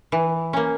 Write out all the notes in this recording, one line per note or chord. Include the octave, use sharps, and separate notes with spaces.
E3
A#3 C#4